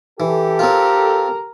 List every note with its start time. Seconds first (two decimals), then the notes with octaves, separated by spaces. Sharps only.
0.20 E3 G4 A4
0.59 C4 F4 A#4